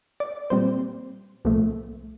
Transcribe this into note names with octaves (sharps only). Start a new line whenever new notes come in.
D5
A#2 G3 C4 C5
C2 A#2 F3 A3